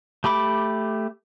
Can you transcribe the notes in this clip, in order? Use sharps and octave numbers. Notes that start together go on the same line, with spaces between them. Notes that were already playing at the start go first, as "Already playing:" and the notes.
A3 G4 B5 D6